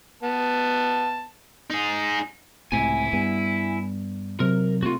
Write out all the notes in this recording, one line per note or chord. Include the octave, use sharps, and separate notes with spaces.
B3 A5
D#4 G#4
C#2 A2 C3 E4 G#5
G2 G3 B3
C3 F#3 A#4
C3 A3 F4 F#4